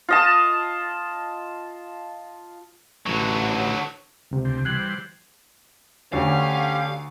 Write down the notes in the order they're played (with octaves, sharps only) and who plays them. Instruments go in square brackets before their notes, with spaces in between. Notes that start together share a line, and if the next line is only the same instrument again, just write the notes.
[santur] F4 D#5 A5
[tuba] A1 [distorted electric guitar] D3 F#3
[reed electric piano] C#2 C3
[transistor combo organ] D2 C4
[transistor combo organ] E3 G3 C5 [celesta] F#6 G#6 F#7
[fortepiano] D2 [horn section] D3 C#4 [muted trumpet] G4 [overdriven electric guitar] F5